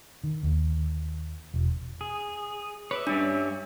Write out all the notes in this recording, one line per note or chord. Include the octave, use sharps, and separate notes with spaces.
D#3
D#2
E1
G#4
B4 C#5 D5 E5
G2 G3 C#4 D4